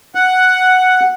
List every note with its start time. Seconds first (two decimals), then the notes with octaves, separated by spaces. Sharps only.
0.15 F#5